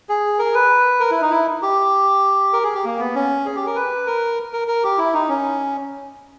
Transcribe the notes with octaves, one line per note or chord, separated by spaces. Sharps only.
G#4
A#4
B4
A#4
E4
D#4
E4
G4
A#4
G#4
G4
A#3
B3
C#4
G#4
G4
A#4
B4
A#4
A#4
A#4
G4
E4
D#4
C#4